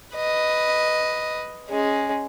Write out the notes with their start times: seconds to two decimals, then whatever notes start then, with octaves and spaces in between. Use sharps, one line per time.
0.15 B4 D#5
1.69 G#3 C#4